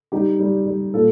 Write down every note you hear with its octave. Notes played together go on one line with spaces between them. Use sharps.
G3 D#4 G4
G3
G3
A#2 F4 A4